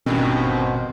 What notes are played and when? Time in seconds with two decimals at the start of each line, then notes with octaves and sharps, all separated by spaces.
0.06 G#1 E2 G2 B2 D#3 C4 C#4